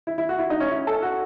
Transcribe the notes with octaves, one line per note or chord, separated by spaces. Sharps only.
E4
E4
F#4
E4
D#4
C#4
E4
A4
F#4